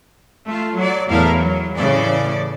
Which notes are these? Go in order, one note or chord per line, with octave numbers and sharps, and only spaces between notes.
A3 F4
F#3 D5
E2 A2 E4 A#4 F5
F#3
A2 C#3 E3 D5